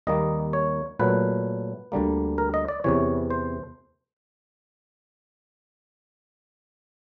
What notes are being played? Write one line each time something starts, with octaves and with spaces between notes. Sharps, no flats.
D#2 D#3 G3 A#3 D#5
C#5
A#2 F#3 A3 B4
D2 D3 G3 A#3
A#4
D#5
D5
E2 C3 E3 C#5
C5